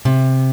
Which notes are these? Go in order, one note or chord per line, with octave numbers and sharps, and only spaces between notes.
C3